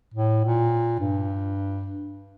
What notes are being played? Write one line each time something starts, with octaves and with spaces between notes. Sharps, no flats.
A2
A#2
G2